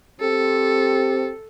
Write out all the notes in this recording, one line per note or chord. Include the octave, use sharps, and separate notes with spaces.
C4 G4 A4